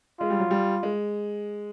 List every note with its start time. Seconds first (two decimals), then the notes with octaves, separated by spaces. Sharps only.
0.20 G#3 F4
0.30 G3
0.40 F#3
0.51 G3
0.83 G#3